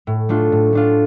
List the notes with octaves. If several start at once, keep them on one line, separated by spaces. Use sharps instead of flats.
A2
A3 D4 F4
A2
A3 D4 F4